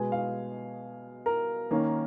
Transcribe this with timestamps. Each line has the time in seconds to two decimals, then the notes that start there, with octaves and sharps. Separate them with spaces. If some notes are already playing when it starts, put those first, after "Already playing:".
Already playing: B2 G#3 B3 G#5
0.12 F5
1.26 A#4
1.71 D#3 A#3 C#4